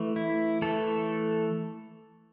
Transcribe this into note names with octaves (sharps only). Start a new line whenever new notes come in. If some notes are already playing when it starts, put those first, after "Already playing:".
Already playing: E3 A3
E4
E3 A3 A4